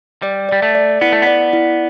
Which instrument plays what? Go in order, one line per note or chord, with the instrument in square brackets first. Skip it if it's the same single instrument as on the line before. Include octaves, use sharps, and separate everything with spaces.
[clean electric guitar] G3 [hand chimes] D5
[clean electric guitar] G3 [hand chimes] D5
[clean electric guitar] A3
[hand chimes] D5
[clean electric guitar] B3 [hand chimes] E4
[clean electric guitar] A3
[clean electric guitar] B3 [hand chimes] D5
[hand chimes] E4